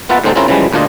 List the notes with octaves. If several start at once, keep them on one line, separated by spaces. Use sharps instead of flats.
A#3 B3 F4 E5 F#5 A5
A2 D3 G#3 C4 D#4 A4
C#3 C4 C#4 E4 F4 A#4
C#3 E3 F3 G3 G#3
D2 A#2 D4 F4 D#5